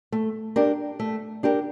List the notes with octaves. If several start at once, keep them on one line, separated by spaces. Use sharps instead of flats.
A3
D4 G4 A#4
A3
D4 G4 A#4